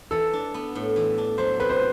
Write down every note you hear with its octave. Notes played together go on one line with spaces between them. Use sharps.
E3 A4
D4
B3
A2
E3
D4
F#3 C5
C3 B4
C5